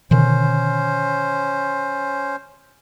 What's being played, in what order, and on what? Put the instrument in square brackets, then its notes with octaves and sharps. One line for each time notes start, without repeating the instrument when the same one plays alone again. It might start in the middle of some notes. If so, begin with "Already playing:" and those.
[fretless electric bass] B2 D3 D#3 [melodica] C#4 C5